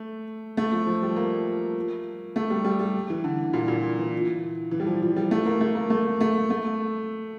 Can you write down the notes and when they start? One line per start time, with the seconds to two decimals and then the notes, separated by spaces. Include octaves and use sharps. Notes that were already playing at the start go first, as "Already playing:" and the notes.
Already playing: A3
0.57 A3
0.72 F3
0.87 F3
1.02 G3
1.16 A#3
2.36 A3
2.50 G3
2.65 G3
2.79 G3
3.10 E3
3.24 D3
3.53 A#2
3.68 A#2
3.99 E3
4.71 E3
4.80 G3
4.86 F3
5.02 F3
5.16 G3
5.31 A3
5.46 A#3
5.61 A3
5.75 A#3
5.90 A3
6.21 A3
6.50 A3